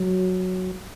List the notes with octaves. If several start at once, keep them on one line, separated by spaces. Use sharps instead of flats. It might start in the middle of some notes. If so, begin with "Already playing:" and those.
Already playing: F#3